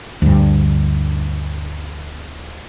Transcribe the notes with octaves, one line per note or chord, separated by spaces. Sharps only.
D2 G2